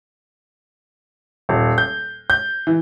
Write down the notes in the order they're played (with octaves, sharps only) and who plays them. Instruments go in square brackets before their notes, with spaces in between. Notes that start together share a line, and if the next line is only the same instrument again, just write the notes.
[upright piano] D#1
G6
G6
E3